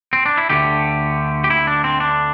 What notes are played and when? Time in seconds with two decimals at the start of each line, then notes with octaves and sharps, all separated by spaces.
0.13 C4
0.26 D4
0.38 E4
0.50 D2 D3 A3 G4
1.44 G4
1.50 E4
1.67 D4
1.84 C4
2.00 D4